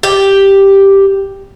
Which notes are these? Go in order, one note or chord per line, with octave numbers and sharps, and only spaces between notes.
G4